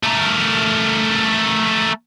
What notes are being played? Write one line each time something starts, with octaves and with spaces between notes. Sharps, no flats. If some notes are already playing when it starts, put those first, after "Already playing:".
A3 A#4